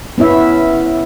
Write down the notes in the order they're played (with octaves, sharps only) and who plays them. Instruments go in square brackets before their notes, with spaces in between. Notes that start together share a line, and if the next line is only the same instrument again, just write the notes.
[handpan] B3 C#4 E4 E5